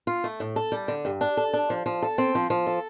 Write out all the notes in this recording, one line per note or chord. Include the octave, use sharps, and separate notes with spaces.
F4
A3
A2
A4
G3
D3
G2
D4
A4
D4
F3
F3
A4
C4
F3
F3
A4